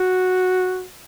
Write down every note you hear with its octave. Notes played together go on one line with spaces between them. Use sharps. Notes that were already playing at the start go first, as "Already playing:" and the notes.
Already playing: F#4